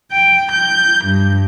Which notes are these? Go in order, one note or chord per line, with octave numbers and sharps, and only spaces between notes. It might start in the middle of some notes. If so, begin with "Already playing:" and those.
G5
G6
G2